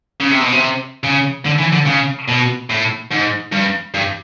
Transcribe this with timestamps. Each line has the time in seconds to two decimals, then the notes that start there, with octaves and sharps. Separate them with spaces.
0.20 C#3
0.31 C3
0.41 B2
0.52 C3
1.04 C#3
1.45 D3
1.58 E3
1.72 D3
1.86 C#3
2.28 B2
2.70 A2
3.11 G#2
3.52 G2
3.94 G2